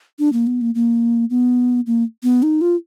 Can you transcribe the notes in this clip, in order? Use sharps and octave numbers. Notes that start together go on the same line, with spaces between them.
D4
A#3
B3
A#3
A#3
B3
A#3
B3
D#4
F4